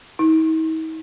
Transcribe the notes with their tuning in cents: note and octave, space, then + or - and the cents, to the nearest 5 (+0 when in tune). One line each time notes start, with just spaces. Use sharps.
D#4 +45